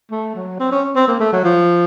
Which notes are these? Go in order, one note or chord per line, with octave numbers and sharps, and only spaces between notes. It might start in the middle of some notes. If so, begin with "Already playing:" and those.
A3
F#3
C4
C#4
C4
A#3
A3
F#3
F3